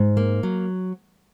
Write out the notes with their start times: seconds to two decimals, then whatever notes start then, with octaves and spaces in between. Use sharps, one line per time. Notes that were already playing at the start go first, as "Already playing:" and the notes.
Already playing: G#2
0.17 A#3
0.43 F#3